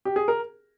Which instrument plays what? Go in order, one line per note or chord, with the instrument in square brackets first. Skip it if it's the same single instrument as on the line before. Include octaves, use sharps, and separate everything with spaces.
[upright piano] G4
G#4
A#4